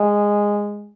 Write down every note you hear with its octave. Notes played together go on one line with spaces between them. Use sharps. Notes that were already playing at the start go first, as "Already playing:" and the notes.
Already playing: G#3